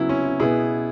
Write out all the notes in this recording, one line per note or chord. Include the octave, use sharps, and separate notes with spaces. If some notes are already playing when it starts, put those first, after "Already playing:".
Already playing: C#3 F#3 B3 E4
C#4
E4
B2 B3 E4 G#4